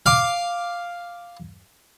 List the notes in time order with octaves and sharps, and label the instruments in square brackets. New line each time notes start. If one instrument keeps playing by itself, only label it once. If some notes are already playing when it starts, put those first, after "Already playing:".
[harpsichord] F5 D6